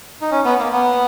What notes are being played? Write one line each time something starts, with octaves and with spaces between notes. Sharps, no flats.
D#4
C#4
B3
A#3
B3